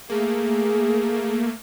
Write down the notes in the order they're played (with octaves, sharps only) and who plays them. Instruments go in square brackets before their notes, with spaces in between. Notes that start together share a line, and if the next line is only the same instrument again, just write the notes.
[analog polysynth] A3 A#3 [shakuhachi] G#4